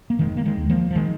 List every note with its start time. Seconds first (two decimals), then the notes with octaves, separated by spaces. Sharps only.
0.10 A#3
0.19 F1 D#3 G#3
0.37 A#3
0.45 D#3 G#3
0.57 D#2
0.70 F3 A#3
0.91 F3
0.96 D#3 G#3